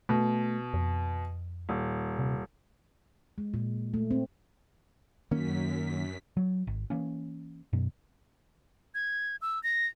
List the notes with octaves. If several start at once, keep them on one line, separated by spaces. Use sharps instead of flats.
B2 A3
F2
D#1
C3
G#3
A#2
A3
C4
F#2 D#3 A#3 C#4 B6
F#3
G#1
E3 A#3 C#4
F#2 B2
G#6
E6
A#6